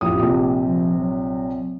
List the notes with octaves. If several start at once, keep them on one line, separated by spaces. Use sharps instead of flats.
A1 F2 G4 D#6
A#1 C3
F3
F#3